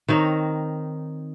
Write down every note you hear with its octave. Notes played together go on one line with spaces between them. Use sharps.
D#3 C4 D#4 C#5